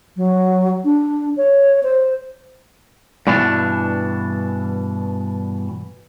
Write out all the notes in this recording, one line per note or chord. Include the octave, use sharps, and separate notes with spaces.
F#3
D4
C#5
C5
G2 B2 E3 D4